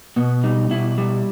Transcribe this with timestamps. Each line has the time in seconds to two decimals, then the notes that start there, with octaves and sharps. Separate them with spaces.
0.16 B2 B3
0.44 G3 D#4
0.71 B2 E4
0.98 G3